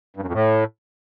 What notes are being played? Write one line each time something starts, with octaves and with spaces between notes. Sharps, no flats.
G2
F#2
F2
A2